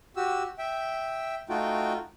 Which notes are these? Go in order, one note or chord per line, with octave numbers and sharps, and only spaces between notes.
F#4 G4 E6
E5 G5
A3 D#4 F4 F#4 G5